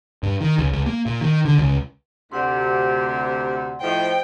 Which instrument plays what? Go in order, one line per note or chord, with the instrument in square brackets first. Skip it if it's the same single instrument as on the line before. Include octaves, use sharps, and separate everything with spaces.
[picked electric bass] G2
D#3
C#2
C#2
A#3
A#2
D#3
D3
C#2
[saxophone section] D2 C3 [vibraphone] D5 F#5 C6
[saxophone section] A2 F3 [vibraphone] C5 D#5 E5 [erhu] G5